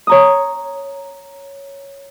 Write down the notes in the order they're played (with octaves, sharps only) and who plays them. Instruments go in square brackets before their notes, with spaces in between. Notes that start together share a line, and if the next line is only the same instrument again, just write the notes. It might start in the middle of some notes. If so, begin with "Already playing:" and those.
[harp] C#5 A#5 D#6